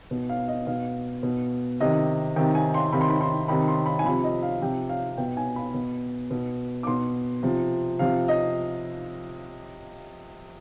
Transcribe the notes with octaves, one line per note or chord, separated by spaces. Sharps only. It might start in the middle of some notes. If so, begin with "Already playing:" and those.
B2
F5
D#5
B2 F5
B2
C3 D#3 D#5
C3 D#3 G5
G#5
C6
C3 D#3 B5
C6
B5
C6
C3 D#3 B5
C6
B5
G#5
C3 F3 B5
D#5
F5
C3 F3 G5
F5
B2 G5
G#5
B5
B2
B2
D6
B2 C6
C3 F3
C3 F3 F5
D#5